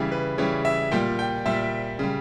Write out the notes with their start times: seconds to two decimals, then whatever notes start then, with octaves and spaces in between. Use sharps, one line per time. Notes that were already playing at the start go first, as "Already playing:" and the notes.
Already playing: C#3 E3 G3
0.12 B4
0.38 C#3 E3 G3 C#5
0.65 E5
0.92 A#2 G3 G5
1.19 G5
1.46 A#2 G3 E5
1.99 C#3 G3